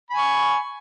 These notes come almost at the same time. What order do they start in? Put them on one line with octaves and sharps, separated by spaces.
B5 G#5 C#6